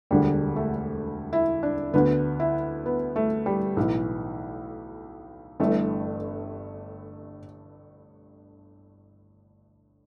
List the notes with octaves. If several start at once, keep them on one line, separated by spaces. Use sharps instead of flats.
E1 D2 D3 G3
A3
E4
D4
D2 D3 B3
E4
B3
A3
G3
B1 A2 E3
G1 G2 E3 A3